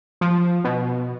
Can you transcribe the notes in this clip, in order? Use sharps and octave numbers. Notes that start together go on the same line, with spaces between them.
F3
B2